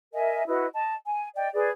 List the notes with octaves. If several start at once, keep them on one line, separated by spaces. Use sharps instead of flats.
A#4 D#5 E5 G#5
E4 F#4 B4 D#5
D#5 A5
G#5
D5 D#5 G5
G#4 B4 D5